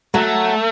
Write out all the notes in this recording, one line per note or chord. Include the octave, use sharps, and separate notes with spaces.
F#3 A3